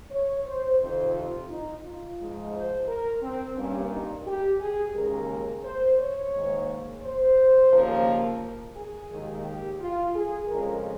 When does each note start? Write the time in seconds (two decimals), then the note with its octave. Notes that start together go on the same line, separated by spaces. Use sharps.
0.11 C#5
0.46 C5
0.80 F2 C3 D#3 C5
1.15 F4
1.50 D#4
1.84 F4
2.18 G#2 F3 G#3
2.53 C5
2.87 A#4
3.22 C4
3.56 G2 G3 A#3 C#4
3.92 D#4
4.26 G4
4.60 G#4
4.95 D#2 C#3 G#3 A#4
5.64 C5
5.98 C#5
6.33 G#2 D#3 A#3
7.02 C5
7.72 D#2 C#3 F3 A#3
8.06 A#4
8.75 G#4
9.10 D#2 D#3 G#3
9.45 G4
9.79 F4
10.14 G#4
10.48 F2 C#3 G#3 A#4